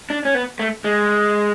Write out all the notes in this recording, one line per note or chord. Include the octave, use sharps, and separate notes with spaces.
D4
C#4
B3
A3
G#3